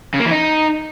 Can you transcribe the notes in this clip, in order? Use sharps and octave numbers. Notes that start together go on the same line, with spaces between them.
C#3
A#3
E3
D#4